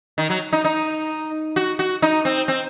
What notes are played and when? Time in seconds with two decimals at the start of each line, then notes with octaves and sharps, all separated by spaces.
0.18 D#3
0.30 F#3
0.53 D#4
0.65 D#4
1.56 F#4
1.79 F#4
2.02 D#4
2.25 C4
2.48 C4